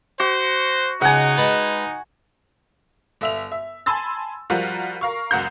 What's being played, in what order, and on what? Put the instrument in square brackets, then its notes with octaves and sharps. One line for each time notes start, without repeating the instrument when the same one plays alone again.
[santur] F#4 [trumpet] C5
[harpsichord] C#2 D#5 A#5 [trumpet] D#4 [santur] F#5 G#5
[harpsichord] G#3 B4 A5
[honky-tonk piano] G1 E5 F7
E5
G#5 A5 B5 C6 E6 A6
F3 G3 F4 F#4 A#4
A#4 F5 C#6
F#1 C#2 F#4 F#5 A#5 G6